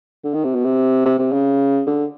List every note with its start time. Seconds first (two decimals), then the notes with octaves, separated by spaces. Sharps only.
0.24 D3
0.34 D#3
0.44 C3
0.55 B2
0.65 C3
1.05 C3
1.19 C3
1.32 C#3
1.87 D3